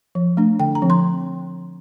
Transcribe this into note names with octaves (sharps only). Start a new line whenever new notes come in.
F3
A3 D4
D3 G5
A#5
F3 C4
C6